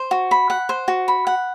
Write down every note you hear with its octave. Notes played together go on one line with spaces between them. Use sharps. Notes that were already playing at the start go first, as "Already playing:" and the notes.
Already playing: C5
F#4
B5
F#5
C5
F#4
B5
F#5